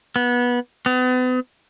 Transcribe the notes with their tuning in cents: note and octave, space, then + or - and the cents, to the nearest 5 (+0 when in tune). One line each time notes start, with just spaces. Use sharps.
B3 -20
B3 +40